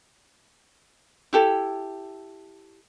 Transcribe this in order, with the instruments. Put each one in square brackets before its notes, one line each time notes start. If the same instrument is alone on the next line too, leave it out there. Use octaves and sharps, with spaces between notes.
[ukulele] E4 G4 A4